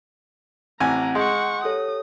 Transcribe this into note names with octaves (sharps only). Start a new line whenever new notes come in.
A1 C4 F#5 G#5 A#5
G#3 F#5 C6 C#6 G6
G4 A4 C#5 D#6